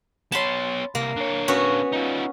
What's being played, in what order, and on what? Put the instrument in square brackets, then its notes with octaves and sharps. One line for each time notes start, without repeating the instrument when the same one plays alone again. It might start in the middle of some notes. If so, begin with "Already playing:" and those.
[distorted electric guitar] B3 C#5 [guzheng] A5 B5 C6
[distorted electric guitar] C2 [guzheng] A#3
[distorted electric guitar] D3 C#5
[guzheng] B3 C#4 F#4
[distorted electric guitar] D#4 F4